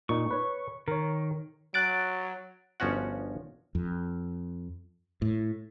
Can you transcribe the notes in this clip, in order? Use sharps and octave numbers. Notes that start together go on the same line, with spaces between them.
A#2 D#4 C#6
B4 C#5
D#3 A#4 C#5
F#3 F#6 A6 D7
G1 F3 C#4 F#4 F#5
F2
A2